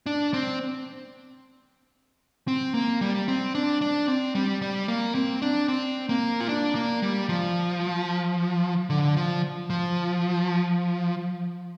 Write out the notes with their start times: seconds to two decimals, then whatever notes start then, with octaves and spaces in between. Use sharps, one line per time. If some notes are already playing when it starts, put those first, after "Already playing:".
0.06 D4
0.33 C4
2.48 C4
2.74 A#3
3.01 G3
3.28 C4
3.55 D4
3.81 D4
4.08 C4
4.35 G3
4.62 G3
4.88 A#3
5.15 C4
5.42 D4
5.68 C4
6.09 A#3
6.41 F4
6.49 D4
6.75 A#3
7.02 G3
7.29 F3
8.90 D3
9.16 F3
9.70 F3